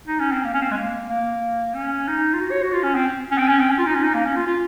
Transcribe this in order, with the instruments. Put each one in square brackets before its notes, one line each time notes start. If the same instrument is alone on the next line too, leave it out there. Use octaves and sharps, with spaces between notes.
[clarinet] D#4
C#4
C4
A#3
C#4
C4
G#3
A#3
A#3
C#4
D#4
F4
F#4
C#5
F#4
F4
C#4
C4
C#4
C4
C#4
C4
C#4
F4
D#4
C#4
D#4
A#3
C#4
F4
F4